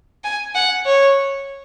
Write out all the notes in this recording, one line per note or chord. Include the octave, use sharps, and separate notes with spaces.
G#5
F#5
C#5